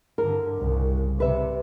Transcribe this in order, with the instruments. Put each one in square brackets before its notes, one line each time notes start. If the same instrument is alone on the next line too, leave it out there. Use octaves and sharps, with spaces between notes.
[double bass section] G2 D3 [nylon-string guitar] A#4
[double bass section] C2 C#3
[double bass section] C3 [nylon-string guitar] B4 E5